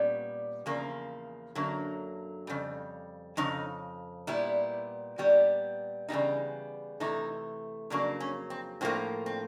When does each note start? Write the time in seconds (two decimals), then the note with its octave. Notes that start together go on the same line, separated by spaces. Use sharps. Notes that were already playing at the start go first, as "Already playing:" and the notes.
Already playing: A#2 G3 B3 C#4
0.66 E2 C#3 F3 A#3
1.55 F#2 D3 F#3 A#3
2.47 F2 C#3 G3
3.37 F2 C#3 D#4
4.27 A#2 G3 B3 E4
5.18 A#2 G3 B3
6.08 C#3 E3 G3 B3 D#4
7.00 C3 E3 A3 D#4
7.90 F2 C#3 F#3 A#3 D4
8.20 C#4
8.50 C4
8.81 A2 F3 A#3 C4
9.26 C4